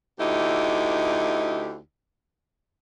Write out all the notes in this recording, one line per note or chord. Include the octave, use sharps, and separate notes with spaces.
D2 D#4 E4 G4